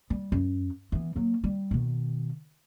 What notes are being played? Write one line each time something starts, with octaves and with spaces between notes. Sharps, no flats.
G3
F#2
E3 B3
F#3 A#3
G3
B2 D#3